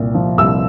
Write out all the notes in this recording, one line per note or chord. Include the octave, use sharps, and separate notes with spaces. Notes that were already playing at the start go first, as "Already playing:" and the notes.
Already playing: C2 A#2
F3
C2 E6